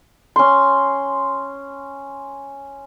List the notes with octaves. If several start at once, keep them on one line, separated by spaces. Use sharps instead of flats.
C#4 C6